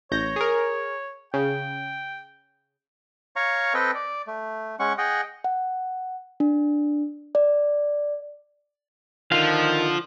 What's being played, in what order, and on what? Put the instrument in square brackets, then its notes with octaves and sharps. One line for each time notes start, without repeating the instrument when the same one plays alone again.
[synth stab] A1 G6 A#6 [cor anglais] C#5
[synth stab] G#4 A#4
[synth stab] C#3 [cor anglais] G5
[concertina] C#5 F5 A#5 C#6
C4 A4 B4 D#5 G5
D5
A3
G#3 C#4 F#5 C#6
G#4 D#5 F#5 G5
[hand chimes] F#5
D4
D5
[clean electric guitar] D3 F5 [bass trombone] D#3 [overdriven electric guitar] F3